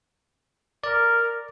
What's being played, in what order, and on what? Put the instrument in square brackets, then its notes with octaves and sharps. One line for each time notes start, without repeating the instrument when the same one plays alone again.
[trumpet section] A#4 [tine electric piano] D5